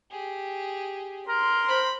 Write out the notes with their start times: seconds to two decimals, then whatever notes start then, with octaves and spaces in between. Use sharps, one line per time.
0.11 G4 G#4
1.28 A#4 C6
1.68 C5 B5